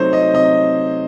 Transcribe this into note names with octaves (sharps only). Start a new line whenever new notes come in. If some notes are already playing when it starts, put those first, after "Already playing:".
Already playing: C3 F#3 A3 C4 D#4 C5 C#5
D#5
C3 D#5